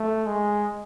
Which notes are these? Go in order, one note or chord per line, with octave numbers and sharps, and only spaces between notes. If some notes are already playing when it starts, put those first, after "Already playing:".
Already playing: A3
G#3